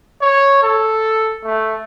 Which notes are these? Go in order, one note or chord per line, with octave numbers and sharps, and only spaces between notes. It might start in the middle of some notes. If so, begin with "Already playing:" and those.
C#5
A4
A3